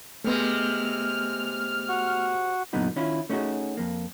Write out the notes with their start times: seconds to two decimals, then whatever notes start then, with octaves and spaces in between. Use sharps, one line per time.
0.24 C3 G#3 A3 B3 F6
1.89 F#4
2.73 F#2 A#2 D3 B3 D#4 F#4
2.96 D#3 C#4 E4 F4
3.30 A3 C#4 D#4 F4 F#4 G#4
3.77 F2 A#3